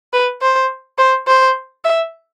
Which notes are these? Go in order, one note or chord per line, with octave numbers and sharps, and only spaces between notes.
B4
C5
C5
C5
E5